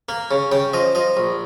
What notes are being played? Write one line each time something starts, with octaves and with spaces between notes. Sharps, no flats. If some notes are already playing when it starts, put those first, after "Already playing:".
A#3
C#3
C#3 G5
F3 D#5
F3 D#5
A#1